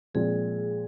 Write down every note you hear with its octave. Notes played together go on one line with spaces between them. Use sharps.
A#2 F3 G#3 C4 G#4